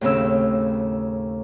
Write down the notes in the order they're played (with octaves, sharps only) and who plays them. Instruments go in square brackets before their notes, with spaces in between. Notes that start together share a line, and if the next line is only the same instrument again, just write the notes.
[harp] D#2 A2 C#3 C4 E6